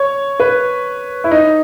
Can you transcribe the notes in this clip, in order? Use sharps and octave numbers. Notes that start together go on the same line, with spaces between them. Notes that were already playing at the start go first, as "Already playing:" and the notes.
Already playing: C#5
B4
E4
D#4